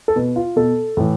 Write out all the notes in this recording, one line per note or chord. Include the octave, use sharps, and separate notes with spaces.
A4
B2 B4
F4
B2 A4
A2 E3